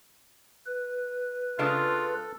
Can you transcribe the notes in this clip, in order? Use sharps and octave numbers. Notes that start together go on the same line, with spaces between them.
B4
C#3 G#3 D4 F4 A4